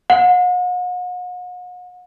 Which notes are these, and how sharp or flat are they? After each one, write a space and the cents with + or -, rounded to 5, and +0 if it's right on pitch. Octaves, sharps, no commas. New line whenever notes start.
F#5 -40